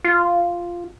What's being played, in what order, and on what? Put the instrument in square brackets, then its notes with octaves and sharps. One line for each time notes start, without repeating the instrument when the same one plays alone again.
[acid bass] F4